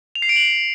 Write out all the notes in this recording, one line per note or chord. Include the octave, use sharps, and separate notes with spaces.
F7
C7
D7
F#7